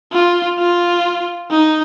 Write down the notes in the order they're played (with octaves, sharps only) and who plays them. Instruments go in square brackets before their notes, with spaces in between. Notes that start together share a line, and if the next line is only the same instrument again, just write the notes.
[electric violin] F4
F4
D#4